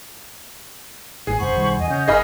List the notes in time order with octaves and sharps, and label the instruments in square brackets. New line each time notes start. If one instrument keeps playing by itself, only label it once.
[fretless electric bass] G#1 A2 [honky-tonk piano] G#4
[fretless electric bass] F1 F#2 [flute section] C5 B5 C#6 [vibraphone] F#5
[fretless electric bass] B1 D#3 G3
[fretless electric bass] E2 [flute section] D#5 G#5
[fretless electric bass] C#3 [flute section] C#4 D#5 G6
[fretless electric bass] G1 [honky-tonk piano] G#4 D#5 B5 [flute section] A#4 F#5 F6